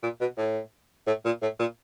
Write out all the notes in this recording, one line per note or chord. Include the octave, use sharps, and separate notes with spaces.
A#2
B2
A2
A2
A#2
A2
A#2